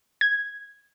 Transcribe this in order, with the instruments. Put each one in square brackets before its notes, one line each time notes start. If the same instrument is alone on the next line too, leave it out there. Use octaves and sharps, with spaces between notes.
[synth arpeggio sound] G#6